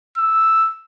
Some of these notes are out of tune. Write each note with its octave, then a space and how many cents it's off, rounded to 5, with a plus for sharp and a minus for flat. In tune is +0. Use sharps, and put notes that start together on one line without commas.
E6 +0